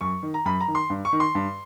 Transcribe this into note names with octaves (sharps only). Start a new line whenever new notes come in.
F#2 C#6
D#3
A#5
F#2 B5
A#5
D#3
C6
G2
C#6
D#3
C6
G2